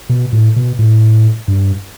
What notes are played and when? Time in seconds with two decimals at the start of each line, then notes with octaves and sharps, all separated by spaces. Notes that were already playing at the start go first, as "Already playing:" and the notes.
0.09 B2
0.33 A2
0.56 B2
0.79 A2
1.48 G2